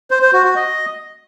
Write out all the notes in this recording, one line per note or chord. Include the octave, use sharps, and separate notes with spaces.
C5
C5
F#4
F#4
D#5